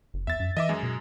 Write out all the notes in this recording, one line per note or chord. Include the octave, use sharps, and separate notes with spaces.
F#1
E2 E5 A6
F#2
E3 D#5 E5 D6
F#2 G#3
B2